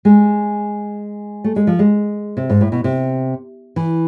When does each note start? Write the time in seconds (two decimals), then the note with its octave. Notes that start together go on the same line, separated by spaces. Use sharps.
0.05 G#3
1.44 A3
1.56 G#3
1.67 F3
1.79 G#3
2.37 C3
2.50 G#2
2.61 A2
2.72 B2
2.84 C3
3.76 E3